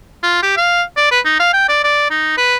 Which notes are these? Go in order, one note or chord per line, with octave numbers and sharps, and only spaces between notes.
F4
G4
F5
D5
B4
D#4
F5
G5
D5
D5
D#4
B4